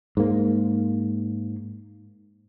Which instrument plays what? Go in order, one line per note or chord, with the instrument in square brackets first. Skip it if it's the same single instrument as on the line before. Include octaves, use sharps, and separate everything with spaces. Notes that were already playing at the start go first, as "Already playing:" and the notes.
[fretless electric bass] G#2 A#3